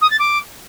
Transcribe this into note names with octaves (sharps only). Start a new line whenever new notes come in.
D#6
A6
D6